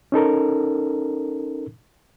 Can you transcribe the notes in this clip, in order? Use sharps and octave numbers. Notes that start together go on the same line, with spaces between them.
C#4 D#4 A4 A#4